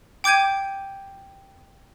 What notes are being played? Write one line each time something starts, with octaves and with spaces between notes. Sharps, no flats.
G5 D6 G6 G#6 D#7